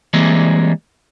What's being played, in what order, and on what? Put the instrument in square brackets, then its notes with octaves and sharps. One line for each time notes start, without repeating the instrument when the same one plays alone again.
[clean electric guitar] E3 G3 G#3 A#3 C4